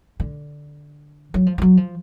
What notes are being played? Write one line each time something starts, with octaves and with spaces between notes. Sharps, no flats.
D3
F#3
F3
F3
F#3
F3